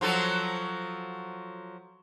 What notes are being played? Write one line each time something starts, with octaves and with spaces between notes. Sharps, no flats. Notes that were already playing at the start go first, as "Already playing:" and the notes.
F3 F#3 A4